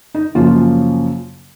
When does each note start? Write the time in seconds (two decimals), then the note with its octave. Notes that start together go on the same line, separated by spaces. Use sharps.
0.15 D#4
0.35 F#2 C#3 F3 A#3 F4